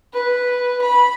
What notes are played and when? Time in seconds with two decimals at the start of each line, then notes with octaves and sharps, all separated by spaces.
0.13 B4
0.81 B5